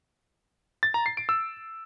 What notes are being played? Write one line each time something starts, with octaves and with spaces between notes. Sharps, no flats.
A6
A#5
C7
D7
E6